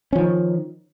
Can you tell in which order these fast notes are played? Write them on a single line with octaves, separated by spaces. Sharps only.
C#4 F3 D#3